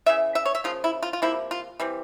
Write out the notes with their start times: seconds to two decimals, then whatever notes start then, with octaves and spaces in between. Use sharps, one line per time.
0.06 C#3 E3 E5
0.35 E5
0.46 C#5
0.55 E5
0.64 C#3 F3 A#3 F4
0.84 E4
1.03 F4
1.13 F4
1.22 C3 F3 A#3 E4
1.51 F4
1.80 E3 G3 C4